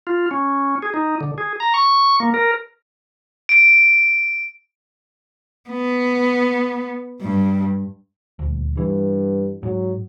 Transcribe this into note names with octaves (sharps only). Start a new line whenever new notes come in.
F4
C#4
G#4
D#4
D3
G#4
A#5
C#6
A#3
A#4
D7
B3
G2
D#1 D2
G2 E3
G#2 F#3